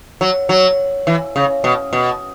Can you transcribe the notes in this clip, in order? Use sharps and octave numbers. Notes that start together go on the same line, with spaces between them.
F#3
F#3
E3
C#3
B2
B2